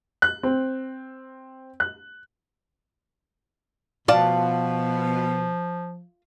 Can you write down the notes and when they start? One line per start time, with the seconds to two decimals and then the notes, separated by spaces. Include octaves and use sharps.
0.22 F#6
0.43 C4
1.80 F#6
4.08 B2 F3 F4 D5 A5